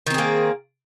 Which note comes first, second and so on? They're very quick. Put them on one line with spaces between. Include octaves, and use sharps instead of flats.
D#3 C4 G#4 A#3